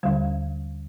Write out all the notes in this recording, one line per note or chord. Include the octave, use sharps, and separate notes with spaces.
D#2 D3 G3